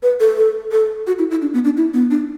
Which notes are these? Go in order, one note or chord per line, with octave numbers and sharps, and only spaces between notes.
B4
A4
A4
A4
F#4
E4
E4
D4
B3
D4
E4
B3
D4